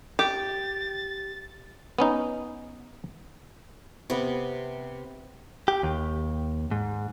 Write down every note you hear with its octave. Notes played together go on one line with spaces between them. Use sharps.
G4 A6
B3 C#4 D#4
C3 B3
G4
D#2
G#2